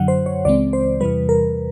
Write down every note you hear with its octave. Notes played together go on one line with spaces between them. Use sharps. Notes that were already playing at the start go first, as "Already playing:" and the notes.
Already playing: F#2 D3 F#3 F#5
C5
C#5
C#2 C#3 E3 G#3 C4 D5
C5
E2 C3 E3 G3 B4
A#4